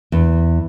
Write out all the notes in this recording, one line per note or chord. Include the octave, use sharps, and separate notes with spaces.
E2